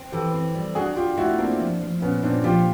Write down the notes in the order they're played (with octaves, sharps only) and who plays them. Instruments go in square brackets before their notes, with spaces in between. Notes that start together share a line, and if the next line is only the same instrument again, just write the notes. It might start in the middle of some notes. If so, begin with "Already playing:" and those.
Already playing: [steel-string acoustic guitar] C4
[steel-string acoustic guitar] E3 [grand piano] G4 A4
[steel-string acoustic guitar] C4
G3
[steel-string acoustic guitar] D4 [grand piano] F#4 G#4
[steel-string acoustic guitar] D4 [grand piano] F4 G4
[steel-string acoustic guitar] A3 [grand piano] E4 F#4
[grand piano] A#3 C4 [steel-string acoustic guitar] D4
[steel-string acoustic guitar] F3
F3
[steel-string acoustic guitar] A#2 [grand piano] B3 C#4
[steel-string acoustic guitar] A#2 [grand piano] C4 D4
[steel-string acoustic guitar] F3 [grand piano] F4 G4